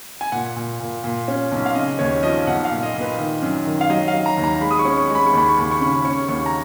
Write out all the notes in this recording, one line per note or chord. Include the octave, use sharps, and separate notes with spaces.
G#5
A#2 F#5
A#2
A#2
A#2
C#4
B1
F5
C#3 D#5
D#2 C#5
F3 D#5
B1 F#5
F5
A#2
D#5
A#2
B4
D#3 D#5
F#2
D#3
F5
F#3 D#5
F5
F#3
A#5
D#2
A#5
G#3 B5
D#6
C#6
C#4
C#6
G#3
B5
C#6
D#2 B5
C#6
D#2 B5
C#6
C#3 B5
C#4 C#6
D#2 C#6
A#5